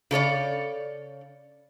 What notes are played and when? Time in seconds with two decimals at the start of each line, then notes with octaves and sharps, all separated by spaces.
0.11 C#3 A4 C#5 D5